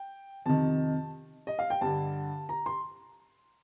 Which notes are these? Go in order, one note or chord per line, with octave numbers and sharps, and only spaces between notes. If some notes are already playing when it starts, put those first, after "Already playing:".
Already playing: G5
F2 C3 D#3 A5
D#5
F5
G5
G2 D3 A5
A#5
C6